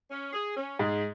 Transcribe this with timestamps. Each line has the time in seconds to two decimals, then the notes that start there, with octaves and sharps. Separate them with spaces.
0.10 C#4
0.33 G#4
0.57 C#4
0.79 G#2 G#4